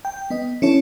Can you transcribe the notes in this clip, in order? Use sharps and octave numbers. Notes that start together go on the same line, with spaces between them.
G5
B3 D#5
C#4 D4 E4 A4 C#5